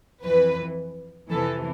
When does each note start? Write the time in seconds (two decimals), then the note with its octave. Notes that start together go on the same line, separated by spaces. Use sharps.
0.23 F2 E3 B4
1.30 F2 C3 E3 A4